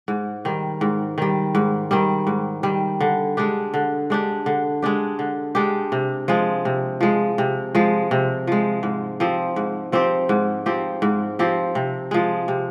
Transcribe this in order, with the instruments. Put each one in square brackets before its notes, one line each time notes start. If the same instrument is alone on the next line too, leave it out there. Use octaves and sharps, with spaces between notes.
[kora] G#2
D#3 G3
G#2
D#3 G3
G#2
D#3 G3
G#2
D#3 G3
D3
G#3 D4 G4
D3
G#3 D4 G4
D3
G#3 D4 G4
D3
G#3 D4 G4
C3
F3 G#3
C3
F3 G#3
C3
F3 G#3
C3
F3 G#3
G#2
F3 C4 G4
G#2
F3 C4 G4
G#2
F3 C4 G4
G#2
F3 C4 G4
C3
F3 G#3
C3